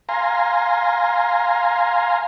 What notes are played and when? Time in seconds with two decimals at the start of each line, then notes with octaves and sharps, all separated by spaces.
0.09 F5 G#5 A#5 C6